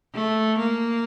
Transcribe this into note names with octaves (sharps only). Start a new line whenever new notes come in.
A3
A#3